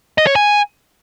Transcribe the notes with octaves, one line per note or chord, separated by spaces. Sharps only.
D#5
C#5
G#5